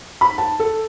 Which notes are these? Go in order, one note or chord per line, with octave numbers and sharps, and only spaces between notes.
B5
A5
A4